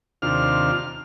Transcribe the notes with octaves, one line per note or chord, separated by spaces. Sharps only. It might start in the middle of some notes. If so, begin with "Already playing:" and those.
D#2 C3 D4 F4 F6